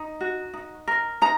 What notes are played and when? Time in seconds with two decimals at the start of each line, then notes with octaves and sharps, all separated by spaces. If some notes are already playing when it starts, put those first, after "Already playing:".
Already playing: D#4
0.21 F#4
0.54 D#4
0.88 A#4
1.22 D#4 A#5